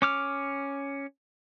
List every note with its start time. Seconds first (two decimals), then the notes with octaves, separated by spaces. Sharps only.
0.02 C#4 D6 F6